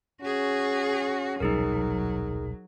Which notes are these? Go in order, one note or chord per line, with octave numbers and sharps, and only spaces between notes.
C#4 F#4 G#4
D#1 B1 F#3 G3 D#4 G#4 A#4